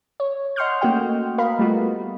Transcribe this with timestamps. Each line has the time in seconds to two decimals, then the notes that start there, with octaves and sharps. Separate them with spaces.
0.20 C#5
0.56 D#5 F#5 C6 C#6 F6 G6
0.81 A3 A#3 C#4 F#4 D#5 G5
1.38 A#4 D#5 F5 B5
1.59 G3 A3 B3 F4 F#4